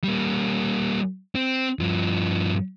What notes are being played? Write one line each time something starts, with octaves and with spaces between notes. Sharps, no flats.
G3 A#3
C4
G2 F3